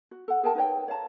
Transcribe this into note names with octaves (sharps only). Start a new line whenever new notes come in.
F#4
A4 F#5
G#4 A#4 G5 A5
D#4 B4 C#5 G5
C#5 F5 A5 A#5